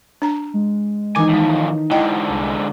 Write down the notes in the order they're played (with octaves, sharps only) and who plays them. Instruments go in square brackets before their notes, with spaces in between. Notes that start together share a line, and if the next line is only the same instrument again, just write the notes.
[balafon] D4 A#5
[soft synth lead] G#3
[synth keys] D#3 E3 D#4 [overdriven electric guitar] G#5 [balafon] D6
[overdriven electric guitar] A2 F3
[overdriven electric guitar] G#2 D3 [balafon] E4 D#5 G5 [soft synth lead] A5
[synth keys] C2